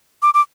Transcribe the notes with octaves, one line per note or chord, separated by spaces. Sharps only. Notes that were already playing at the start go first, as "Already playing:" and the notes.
D6
D6